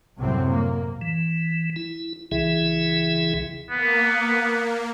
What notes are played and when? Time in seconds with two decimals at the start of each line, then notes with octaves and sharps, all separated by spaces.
0.18 C2 F#2 A2 C3 F#3 C4
0.49 A#3
1.01 E3
1.76 E4
2.32 C2 C#3 E3 E4 G#4 E5
3.71 A#3 B3